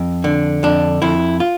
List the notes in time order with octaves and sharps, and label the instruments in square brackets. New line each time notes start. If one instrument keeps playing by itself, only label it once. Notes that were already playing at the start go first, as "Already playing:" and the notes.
Already playing: [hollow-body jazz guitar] F2
D3
F2 D4
F2 E4
F4